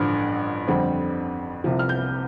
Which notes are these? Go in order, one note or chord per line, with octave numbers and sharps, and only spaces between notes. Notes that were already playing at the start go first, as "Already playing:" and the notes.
Already playing: A1 G2 D3 F3 F6
F2 D3 G3 C4
C2 C3 F3
F6
G6